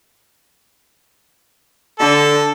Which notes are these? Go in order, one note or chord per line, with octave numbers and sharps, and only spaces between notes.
D3 A4